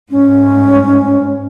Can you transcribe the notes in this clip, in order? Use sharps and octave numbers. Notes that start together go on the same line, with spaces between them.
G#2 C#4